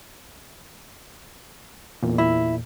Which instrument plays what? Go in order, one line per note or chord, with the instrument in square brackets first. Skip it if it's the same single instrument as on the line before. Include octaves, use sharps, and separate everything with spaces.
[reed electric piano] E2 A#2
[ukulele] E4